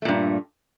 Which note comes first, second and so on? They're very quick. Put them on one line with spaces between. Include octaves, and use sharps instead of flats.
A3 A#2 G2